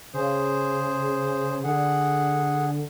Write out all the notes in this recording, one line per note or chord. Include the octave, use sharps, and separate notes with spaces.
C#3 G#4 C5
D3 G#4 F#5